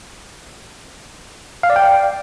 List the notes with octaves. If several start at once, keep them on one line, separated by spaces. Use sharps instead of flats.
F5
D5
G5